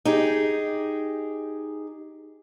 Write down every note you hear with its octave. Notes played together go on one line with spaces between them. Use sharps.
D#4 G4 G#4